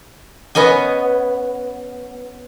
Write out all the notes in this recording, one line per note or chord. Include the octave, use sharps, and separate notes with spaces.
B3 C#4 D#5 G#5